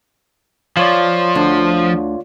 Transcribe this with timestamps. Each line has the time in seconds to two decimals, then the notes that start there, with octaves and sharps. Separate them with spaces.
0.77 F3 F4 C#5 D5
1.35 D2 D3